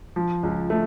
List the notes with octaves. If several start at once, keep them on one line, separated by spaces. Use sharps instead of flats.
F3
C#2
A3